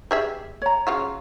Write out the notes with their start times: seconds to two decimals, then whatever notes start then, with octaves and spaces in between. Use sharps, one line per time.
0.11 G4 G#4 E5
0.62 C#5 A#5
0.87 C#3 F4 F#4